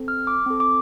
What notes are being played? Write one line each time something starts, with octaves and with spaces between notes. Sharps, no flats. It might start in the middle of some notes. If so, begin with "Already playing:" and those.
Already playing: C4 A4
F6
D6
C4 A4
D6